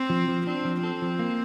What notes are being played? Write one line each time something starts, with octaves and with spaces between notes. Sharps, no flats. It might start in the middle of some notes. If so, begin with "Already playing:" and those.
Already playing: C4
F3
F3
C4 D4
F3
C4 A4
F3
A#3